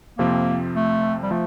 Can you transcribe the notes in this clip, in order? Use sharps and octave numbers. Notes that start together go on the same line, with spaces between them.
F2 C3 F3 A#3 C4
A3
G3
F3 A3